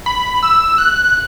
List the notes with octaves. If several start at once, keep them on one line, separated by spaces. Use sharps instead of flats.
B5
E6
F#6